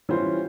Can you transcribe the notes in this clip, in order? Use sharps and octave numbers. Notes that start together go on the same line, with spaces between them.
E3 G3 C#4 F4 C5